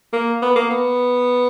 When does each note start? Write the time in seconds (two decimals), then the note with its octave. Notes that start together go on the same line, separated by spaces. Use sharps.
0.13 A#3
0.42 B3
0.56 A#3
0.70 B3